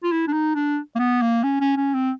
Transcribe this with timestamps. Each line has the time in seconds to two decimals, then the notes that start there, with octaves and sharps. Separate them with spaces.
0.04 F4
0.12 E4
0.28 D4
0.33 D#4
0.55 D4
0.96 A#3
0.99 B3
1.22 A#3
1.43 C#4
1.61 C#4
1.77 C#4
1.94 C4